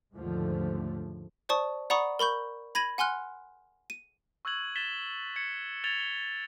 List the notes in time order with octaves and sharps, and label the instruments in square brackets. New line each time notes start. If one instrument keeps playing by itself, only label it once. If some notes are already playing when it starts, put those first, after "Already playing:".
[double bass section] D#2 G#2 D3 F3 A3
[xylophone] C5 D5 A5 C#6 D#6
D5 F#5 A#5 B5 C#6 D#6
A#4 B5 C#6 G6
B5 G#6 A#6 D#7 F#7
F#5 G#5 C6 F6 F#6
D#7
[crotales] C#6 E6 F#6 G#6 F#7
A6 B6 E7 G7
G#6 C#7
G#6 A6 D7 F7 G7
G7